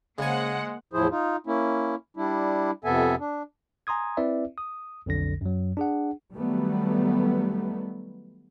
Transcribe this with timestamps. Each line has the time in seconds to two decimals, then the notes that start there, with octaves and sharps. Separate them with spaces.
0.18 C#3 G#3 A#3 C5 F#5 G#5
0.93 E2 A2 F3 E4 G#4 C5
1.10 D#4 F4
1.47 A#3 C#4 E4
2.17 G3 D4 E4
2.85 F2 C3 B3 A4 E5 G#5
3.20 D4
3.87 G#5 A#5 C6 D#6 G#6
4.17 C4 E4 B4 D5 E5
4.58 D#6
5.06 B1 F2 D3 A#6
5.41 F#2 F#3
5.77 D4 G#4 F#5
6.34 D#3 F#3 G3 A3 B3